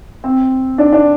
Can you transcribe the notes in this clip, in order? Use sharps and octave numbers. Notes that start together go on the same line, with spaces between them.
C4
D4
D4